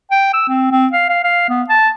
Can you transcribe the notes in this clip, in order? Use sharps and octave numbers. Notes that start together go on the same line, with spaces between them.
G5
E6
C4
C4
F5
F5
F5
B3
A5